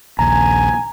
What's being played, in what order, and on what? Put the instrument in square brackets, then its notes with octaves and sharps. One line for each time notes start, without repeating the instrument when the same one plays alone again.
[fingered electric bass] A#1 D#2 [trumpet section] G#5 [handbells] A#5